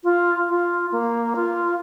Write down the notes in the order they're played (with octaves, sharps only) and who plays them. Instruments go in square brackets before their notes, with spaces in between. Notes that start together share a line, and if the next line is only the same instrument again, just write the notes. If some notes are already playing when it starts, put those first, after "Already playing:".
[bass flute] F4
F4
A#3
F4